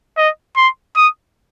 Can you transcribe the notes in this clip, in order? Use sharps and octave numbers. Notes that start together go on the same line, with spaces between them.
D#5
C6
D#6